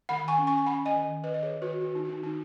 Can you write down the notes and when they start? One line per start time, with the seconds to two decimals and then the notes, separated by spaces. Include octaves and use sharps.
0.09 D#3 F#5 B5
0.28 G#5 C#6
0.38 C#4
0.47 G#5 C#6
0.58 G#5
0.66 C#4 F#5 B5
0.86 D#5 G#5
0.95 D#3
1.24 D#3 B4 D#5
1.34 D#5
1.43 G#4 C#5
1.53 D#3
1.62 F#4 B4
1.81 D#3 F#4
1.95 D#4
2.05 F#4
2.09 D#3 D#4
2.24 D#4